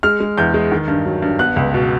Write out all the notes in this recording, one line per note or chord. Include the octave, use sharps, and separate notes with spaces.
G#3 F6
G#3
E2 G6
G#3
D#3
G2
F#3
G2
B3 F#6
C#2
B2